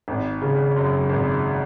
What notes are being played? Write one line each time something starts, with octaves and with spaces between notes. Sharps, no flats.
G#1
C#3
F#2
G#1